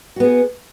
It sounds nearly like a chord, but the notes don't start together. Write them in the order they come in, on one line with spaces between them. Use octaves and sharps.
F#4 B3 G#4